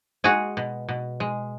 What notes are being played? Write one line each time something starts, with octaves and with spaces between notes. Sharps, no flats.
G#3 F#4 G#4
B2
B2
G#3